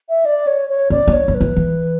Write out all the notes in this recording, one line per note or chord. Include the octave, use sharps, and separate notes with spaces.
E5
D5
C#5
C#5
C#4 D5
D4
C#5
F#3
B4
E3
E3